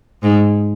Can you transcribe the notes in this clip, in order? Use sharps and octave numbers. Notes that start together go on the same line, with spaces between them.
G#2